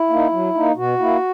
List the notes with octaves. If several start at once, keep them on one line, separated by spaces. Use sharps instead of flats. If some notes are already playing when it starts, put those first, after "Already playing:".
Already playing: E4
A#3 D#4
F#3
A#3 D#4
B2 F#4
A#3 E4